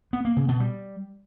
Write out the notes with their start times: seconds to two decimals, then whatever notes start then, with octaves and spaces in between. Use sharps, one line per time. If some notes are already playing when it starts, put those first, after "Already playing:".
0.13 B3
0.25 A#3
0.37 C#3
0.48 B2
0.60 G3